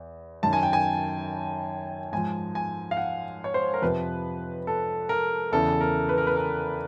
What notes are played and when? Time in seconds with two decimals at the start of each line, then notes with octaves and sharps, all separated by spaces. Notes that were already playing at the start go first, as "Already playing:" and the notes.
Already playing: E2
0.43 F#2 D#3 A5
0.53 G#5
0.63 G5
0.73 G#5
2.12 G#2 F3 G#5
2.55 G#5
2.91 F5
2.97 F#5
3.44 C#5
3.54 C5
3.74 A#4
3.82 F2 C3 F3 B4
4.67 A4
5.09 A#4
5.52 E2 C#3 E3 A4
5.81 A#4
6.09 B4
6.18 A#4
6.27 B4
6.37 A#4